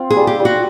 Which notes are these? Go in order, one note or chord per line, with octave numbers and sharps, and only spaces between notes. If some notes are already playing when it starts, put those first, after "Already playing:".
Already playing: C4 F4
G#4
G3
G4
G3
F#4